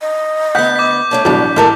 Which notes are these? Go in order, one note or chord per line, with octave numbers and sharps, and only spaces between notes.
D#5
D2 B3 F#5 G6 B6
D6 B6
A3 A#3 D4 C#5
A1 G2 B2 F#3 D4 A5
A1 A2 G#3 A4 A#4